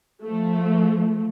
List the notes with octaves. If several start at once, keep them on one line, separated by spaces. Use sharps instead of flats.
F3 A3